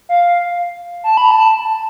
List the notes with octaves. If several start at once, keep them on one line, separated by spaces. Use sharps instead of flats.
F5
A5
B5
A5